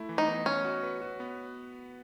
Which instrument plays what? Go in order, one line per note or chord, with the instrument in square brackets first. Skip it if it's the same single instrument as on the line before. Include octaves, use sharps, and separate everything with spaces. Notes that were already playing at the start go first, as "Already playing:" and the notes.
Already playing: [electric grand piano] A3 E4
E3
[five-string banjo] D#4
[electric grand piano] B3
[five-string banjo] C#4 [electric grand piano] D#5
[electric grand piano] F#4
B4
F#4
B3